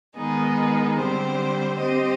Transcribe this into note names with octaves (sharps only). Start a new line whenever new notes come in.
D#3 G#3 B3 D#4 G#4
D3 G3 C4 G4 C5
C4 G4 C5 D#5